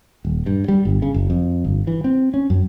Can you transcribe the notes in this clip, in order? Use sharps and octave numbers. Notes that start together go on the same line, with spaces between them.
D#1
G2
G3
G1
C#3
F#1
F2
G1
E3
C4
C#4
F#2